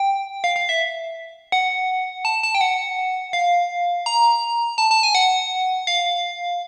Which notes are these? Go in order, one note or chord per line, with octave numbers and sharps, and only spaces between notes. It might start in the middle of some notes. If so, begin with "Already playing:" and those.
Already playing: G5
F5
F5
E5
F#5
A5
A5
G5
F#5
F5
A#5
A5
A5
G#5
F#5
F5